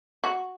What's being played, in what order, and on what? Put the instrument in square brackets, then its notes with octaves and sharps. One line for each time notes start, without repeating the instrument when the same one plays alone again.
[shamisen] F#4